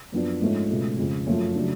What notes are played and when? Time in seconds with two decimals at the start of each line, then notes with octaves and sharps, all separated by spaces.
0.12 F#2 F3 B3 D4
0.41 G#2 F3 A3 C#4
0.69 C#2 B2 A3 C#4
0.98 F2 C#3 G#3
1.26 F#2 F3 A3 C#4
1.56 C#3 F#3 A3 D4